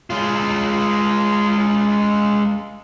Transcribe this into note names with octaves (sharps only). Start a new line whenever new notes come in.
G#3 F4